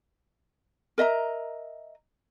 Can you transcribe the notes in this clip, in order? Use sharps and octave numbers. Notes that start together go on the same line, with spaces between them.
A#4 D#5 E5 A#5